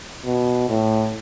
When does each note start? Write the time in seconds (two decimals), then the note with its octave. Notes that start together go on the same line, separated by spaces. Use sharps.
0.26 B2
0.69 A2